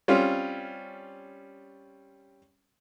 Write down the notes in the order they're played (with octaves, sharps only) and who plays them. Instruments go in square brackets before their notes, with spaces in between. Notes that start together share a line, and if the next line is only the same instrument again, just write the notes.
[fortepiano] G3 C4 C#4 F4